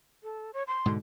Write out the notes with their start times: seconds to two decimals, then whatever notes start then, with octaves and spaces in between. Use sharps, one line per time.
0.23 A4
0.53 C#5
0.68 C6
0.86 G#2 B2 D3